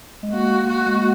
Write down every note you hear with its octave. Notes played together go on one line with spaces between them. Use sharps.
G#3
A#3 F#4
F#4
G#3
A#3